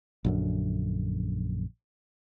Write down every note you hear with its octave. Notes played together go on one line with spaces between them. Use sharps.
A#1 F#2 D3